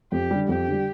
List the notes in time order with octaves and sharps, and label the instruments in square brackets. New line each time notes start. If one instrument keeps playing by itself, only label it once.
[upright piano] F2 [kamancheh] G4
[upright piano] D3 G3
[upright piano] F2 [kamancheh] G4
[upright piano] D3 G3